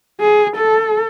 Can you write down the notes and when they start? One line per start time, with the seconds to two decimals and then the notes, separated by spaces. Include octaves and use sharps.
0.21 G#4
0.56 A4